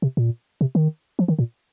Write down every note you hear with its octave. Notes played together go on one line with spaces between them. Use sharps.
C3
A#2
C3
D#3
F3
D#3
A#2